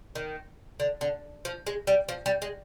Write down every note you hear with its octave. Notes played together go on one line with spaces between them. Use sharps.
D#3
D3
D3
F3
G#3
G3
F3
G3
G#3